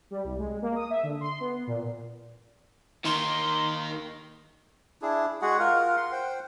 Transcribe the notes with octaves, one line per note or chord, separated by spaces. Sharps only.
G3
C2
G#3
A#3
D#6
E5
D3
C6
B3
A#2
D#3 A#3 D#4 A#4 C6
D4 E4 G#4
G#3 F#4 G#4 F#5
F4 A#4 F#5
C6
C5 F#5 G5